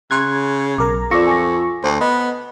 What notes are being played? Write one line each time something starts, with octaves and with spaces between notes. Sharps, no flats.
C#3 C6 F#6 G#6
B1 A#4 A#5 D6
F2 F4 D5 C#6 D6 E6 A#6
G#5 D6 A#6
D2 C5
B3 D#5